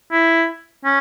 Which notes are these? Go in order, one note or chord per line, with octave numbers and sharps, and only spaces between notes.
E4
C#4